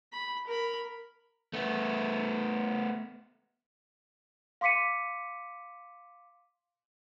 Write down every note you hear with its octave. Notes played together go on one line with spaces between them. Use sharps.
B5
A#4 B5
A3 B3
F5 C6 D6 B6 C#7 D#7